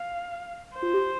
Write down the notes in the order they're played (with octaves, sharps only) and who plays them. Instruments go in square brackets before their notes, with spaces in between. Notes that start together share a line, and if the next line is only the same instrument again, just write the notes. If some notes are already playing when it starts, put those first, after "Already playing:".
Already playing: [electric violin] F5
C5
[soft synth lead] F4
G4